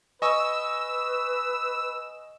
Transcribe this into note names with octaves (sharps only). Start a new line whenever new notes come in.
B4 D#5 G#5 C#6 E6